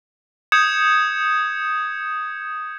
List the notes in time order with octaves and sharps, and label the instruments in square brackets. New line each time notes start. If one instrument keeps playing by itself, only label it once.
[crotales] D#6 G6 G#6 C#7 E7